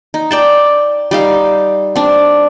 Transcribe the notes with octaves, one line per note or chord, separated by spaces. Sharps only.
D#4
D5 G5 A5
G3 D#4 F5
C4 D4